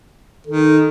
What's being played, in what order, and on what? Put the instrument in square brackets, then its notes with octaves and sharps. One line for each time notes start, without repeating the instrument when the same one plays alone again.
[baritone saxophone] D#3 [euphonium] A4